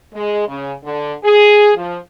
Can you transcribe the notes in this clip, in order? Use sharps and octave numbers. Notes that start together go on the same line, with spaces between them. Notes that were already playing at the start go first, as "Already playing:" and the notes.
G#3
C#3
D3
G#4
F3